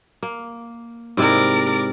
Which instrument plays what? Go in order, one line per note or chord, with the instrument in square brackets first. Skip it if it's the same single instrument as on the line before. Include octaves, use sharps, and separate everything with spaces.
[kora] A#3
[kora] G#2 C3 E4 [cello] A#4 D5